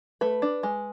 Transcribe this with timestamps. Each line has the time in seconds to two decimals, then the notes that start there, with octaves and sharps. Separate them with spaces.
0.21 A3 B4
0.42 D4
0.63 G#3